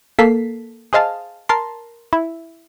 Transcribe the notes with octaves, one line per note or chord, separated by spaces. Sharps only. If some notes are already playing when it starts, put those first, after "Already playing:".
A#3 A4 B6 C7
G#4 C5 D#5 F5 A5
A#4 A5 C6
E4